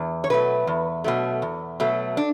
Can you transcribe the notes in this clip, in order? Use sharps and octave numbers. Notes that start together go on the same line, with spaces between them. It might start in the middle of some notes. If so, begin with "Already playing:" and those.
Already playing: E2
C#5
B2 F#3 A3 B4
E2
B2 F#3 A3
E2
B2 F#3 A3
D4